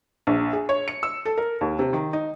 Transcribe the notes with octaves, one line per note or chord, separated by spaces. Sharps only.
A#1
G#4
C#5
C#7
E6
A4
A#4
D#2
C3
D#3
D#4